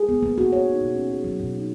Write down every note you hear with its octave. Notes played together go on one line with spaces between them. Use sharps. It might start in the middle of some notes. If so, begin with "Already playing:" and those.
Already playing: G#4
B3
A#3
F#4
C#5
D#4
B2
C#4
G#4
F#3
B2
D#4